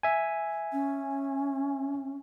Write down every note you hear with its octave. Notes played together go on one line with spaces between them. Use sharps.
E5 G#5
C#4